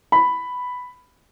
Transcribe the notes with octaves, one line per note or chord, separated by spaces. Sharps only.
B5